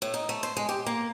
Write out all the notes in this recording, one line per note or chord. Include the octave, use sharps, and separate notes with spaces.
A2
D#4
A3
C5
G#3
G4
A#3